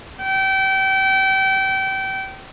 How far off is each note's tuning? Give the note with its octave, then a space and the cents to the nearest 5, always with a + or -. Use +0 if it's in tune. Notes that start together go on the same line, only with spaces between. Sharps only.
G5 -30